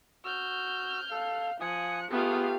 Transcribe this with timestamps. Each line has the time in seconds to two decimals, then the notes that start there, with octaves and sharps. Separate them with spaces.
0.25 F#4 E6 F6 G6
1.11 A4 F5
1.61 F3 G#5 D#6 F#6 C#7
2.11 A3 B3 F4 G4 G#4 F5